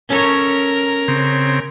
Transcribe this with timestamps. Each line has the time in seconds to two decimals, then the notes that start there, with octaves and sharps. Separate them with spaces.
0.10 C#4 A4 A#4 C#5
1.08 C#3 C4